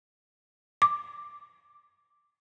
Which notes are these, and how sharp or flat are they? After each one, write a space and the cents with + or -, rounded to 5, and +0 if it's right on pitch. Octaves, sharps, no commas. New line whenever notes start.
D6 +10